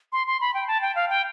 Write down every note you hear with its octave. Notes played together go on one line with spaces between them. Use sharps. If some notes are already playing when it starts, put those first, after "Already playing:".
C6
C6
B5
G5
A5
G5
F5
G5